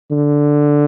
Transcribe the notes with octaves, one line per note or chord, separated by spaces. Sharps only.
D3